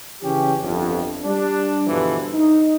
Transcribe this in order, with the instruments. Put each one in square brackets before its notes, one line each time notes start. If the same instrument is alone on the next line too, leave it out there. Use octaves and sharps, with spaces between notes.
[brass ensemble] C#3 E3 C#4 G4
G1 F2
G3 D4
G2 B2 D3 E3 F3
D#4